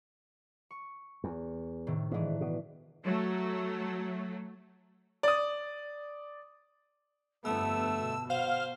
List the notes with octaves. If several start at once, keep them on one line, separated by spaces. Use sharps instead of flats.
C#6
E2
A2 C3 D#3
G#2 E3 D4
B2
F#3 A3
D5 D#6
G1 F2 A3 B3 A5 E6
B2
C5 F5 F#5